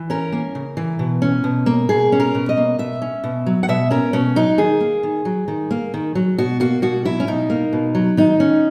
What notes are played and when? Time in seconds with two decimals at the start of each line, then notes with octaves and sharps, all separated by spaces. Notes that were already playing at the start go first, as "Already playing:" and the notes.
Already playing: E3
0.10 C#4 A#4
0.32 A#3
0.55 C#3
0.77 E3
0.99 B2
1.22 C#4
1.44 B2
1.66 A#3
1.89 B2 G#4
2.12 C#4
2.20 A#4
2.35 B2
2.49 D#5
2.57 A#3
2.78 B2 E5
3.02 C#4
3.24 B2
3.46 F#3
3.63 F#5
3.68 B2 E5
3.91 C#4 A#4
4.13 B2 C#4
4.36 F#3 D#4
4.58 D#3 G#4
4.80 A#3
5.03 D#3
5.25 F#3
5.48 D#3
5.71 A#3
5.94 D#3
6.15 F#3
6.38 B2 F#4
6.60 A#3 F#4
6.82 B2 F#4
7.05 F#3 E4
7.20 C#4
7.27 B2 D#4
7.50 A#3
7.73 B2
7.95 F#3
8.17 D#3 D#4
8.40 C#4